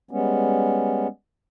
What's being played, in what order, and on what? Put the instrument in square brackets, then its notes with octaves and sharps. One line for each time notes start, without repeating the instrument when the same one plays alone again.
[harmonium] G3 G#3 B3 C#4